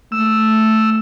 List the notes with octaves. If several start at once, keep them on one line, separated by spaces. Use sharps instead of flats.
A3 E6